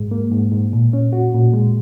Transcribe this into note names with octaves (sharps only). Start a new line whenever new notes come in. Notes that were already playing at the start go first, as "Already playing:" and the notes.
Already playing: G#2 G#3
A#3
G#2
G#2
A#2
C#4
F#4
A#2
G#3